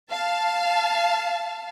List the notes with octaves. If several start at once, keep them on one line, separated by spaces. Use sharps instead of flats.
F5 A5